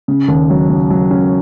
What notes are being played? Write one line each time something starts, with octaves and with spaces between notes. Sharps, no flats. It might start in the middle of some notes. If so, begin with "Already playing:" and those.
C#3
D#2
F#3
C#3
F#3
C#4